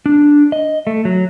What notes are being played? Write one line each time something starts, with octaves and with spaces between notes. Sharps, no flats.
D4
D#5
A3
F#3